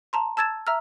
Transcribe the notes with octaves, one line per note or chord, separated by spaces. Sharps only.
A5 A#5 C6
A5 E6 G#6 A6 E7
E5 A#5 E6 F6